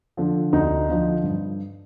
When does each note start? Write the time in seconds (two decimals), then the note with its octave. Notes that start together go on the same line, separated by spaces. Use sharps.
0.17 D3 F3
0.53 D2 D#4
0.89 D3 F3
1.24 G2